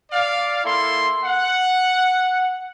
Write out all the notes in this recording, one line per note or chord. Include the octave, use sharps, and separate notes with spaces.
D5 F5
A#3 E4 A4 C6
F#5